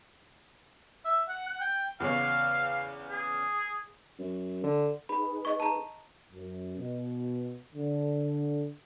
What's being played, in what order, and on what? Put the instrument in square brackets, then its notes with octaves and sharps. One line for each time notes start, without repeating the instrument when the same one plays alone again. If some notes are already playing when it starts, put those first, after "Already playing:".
[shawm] E5
F#5
F#5
G5
[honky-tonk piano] E2 C#3 C#5 [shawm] F5
[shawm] G#4
[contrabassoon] F#2
D3
[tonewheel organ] D#4 G#4 B4 [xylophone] B5
[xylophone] D#5 C#6
A5 A#5
[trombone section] F#2
B2
D3